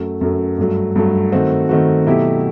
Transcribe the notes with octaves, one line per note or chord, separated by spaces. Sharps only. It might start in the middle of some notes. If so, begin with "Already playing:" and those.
Already playing: F#2 F#3 A3
F#2 F#3 A3
G2 F#3 A3
G2 F#3 A3
D#3 A3 C4 F#4
D#3 A3 C4 F#4
B2 F#3 A3 E4 G4